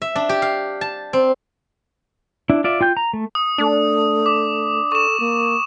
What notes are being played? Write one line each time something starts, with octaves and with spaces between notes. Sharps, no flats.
E5
D4
G4
F5
A5
C4
D4 E4
F4 D5 E5
F4 G5 G6
A#5
A3
D#6
A3 D4
D6
A4 C#6 E7
A#3